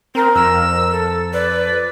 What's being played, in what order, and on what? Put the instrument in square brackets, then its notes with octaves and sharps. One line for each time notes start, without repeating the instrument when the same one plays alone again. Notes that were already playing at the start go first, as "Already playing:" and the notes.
[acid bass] C4 [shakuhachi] A#4
[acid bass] F2 [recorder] E6
[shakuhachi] A4
[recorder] B4 [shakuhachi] D5